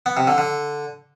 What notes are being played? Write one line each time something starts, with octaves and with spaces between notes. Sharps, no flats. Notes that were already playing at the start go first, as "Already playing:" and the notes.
B3
C3
D3
D3